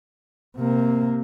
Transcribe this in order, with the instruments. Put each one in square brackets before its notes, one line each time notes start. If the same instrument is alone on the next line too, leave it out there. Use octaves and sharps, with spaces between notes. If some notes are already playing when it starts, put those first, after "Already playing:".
[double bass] C3 A#3